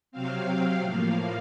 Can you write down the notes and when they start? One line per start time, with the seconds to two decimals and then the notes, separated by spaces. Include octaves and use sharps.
0.12 C3 F#3 C4 F5
0.82 A2 F3 A#3 F5